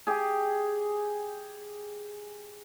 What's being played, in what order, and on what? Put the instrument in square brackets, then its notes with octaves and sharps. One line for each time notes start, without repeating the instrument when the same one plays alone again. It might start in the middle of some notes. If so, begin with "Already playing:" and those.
[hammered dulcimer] G4 G#4